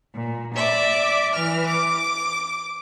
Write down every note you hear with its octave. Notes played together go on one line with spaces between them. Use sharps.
A#2
D5 E5 D6
E3 F6
D6